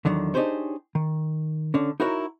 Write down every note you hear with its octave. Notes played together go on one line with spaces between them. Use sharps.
E2 D3 D#3 F#3
D4 D#4 G4 G#4 C5 C#5
D#3
D3 C#4
D#4 E4 F#4 A#4 C#5